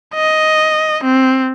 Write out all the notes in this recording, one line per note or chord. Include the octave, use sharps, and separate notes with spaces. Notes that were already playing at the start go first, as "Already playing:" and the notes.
D#5
C4